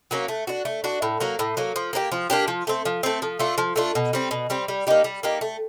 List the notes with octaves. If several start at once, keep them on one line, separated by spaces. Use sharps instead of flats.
F#3 A#3 C#4
A3
D4 F#4
A3
D4 F#4
A2
F#3 A#3
A2
F#3 A#3
F3
A#3 D4 G4
F3
A#3 D4 G4
F3
A3 C4
F3
A3 C4
F3
A3 D4 F4
F3
A3 D4 F4
B2
G3 C4
B2
G3 C4
G3
A#3 D#4 G4
G3
A#3 D#4 G4
A3